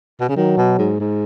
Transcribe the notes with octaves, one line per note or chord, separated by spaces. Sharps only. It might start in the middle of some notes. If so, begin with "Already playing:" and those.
B2
C#3
D#3 F#3
B2
G#2
G#2